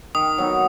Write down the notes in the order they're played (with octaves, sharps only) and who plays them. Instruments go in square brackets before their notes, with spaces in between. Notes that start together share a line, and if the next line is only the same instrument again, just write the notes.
[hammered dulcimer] D#3 [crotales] D#6
[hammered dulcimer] F#3 B3 D#4